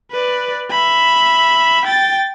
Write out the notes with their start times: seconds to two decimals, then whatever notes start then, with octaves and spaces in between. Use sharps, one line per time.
0.11 B4 D5
0.70 E5 B5
1.85 G5 A6